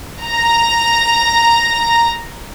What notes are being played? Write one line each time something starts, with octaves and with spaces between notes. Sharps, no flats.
A#5 A#6